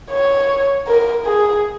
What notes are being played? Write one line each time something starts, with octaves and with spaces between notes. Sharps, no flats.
C#5
A#4
G#4